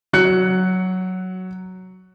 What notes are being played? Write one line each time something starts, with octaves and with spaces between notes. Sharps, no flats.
F#3 F#6 C#7